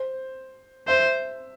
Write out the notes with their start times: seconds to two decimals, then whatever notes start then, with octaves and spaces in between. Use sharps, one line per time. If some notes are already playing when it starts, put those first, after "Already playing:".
Already playing: C5
0.87 C5 E5